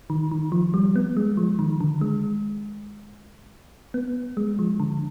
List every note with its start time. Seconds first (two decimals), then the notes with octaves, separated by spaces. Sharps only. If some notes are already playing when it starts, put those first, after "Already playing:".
0.10 D#3
0.31 D#3
0.52 F3
0.74 G3
0.96 B3
1.17 G#3
1.37 F3
1.59 D#3
1.81 D3
2.01 G#3
3.94 B3
4.37 G#3
4.59 F3
4.80 D3